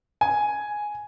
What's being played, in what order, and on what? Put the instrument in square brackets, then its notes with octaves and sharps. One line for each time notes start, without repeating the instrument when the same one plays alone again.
[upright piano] G#5